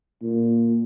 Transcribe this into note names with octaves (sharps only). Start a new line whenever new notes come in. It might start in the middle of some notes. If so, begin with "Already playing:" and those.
A#2